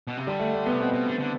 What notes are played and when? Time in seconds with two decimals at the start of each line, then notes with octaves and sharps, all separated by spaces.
0.07 B2
0.17 C3
0.27 D3 G3
0.40 A3
0.53 A3
0.66 B3
0.73 C3
0.80 B2 C4
0.93 B2
1.06 D3
1.19 D3